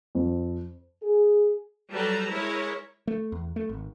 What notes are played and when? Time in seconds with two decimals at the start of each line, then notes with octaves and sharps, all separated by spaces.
0.15 F2
1.03 G#4
1.93 F#3 G3 A4 B4 A5 A#5
2.31 G#3 E4 A#4 C#5
3.07 A3
3.32 E2
3.56 A3
3.69 G#1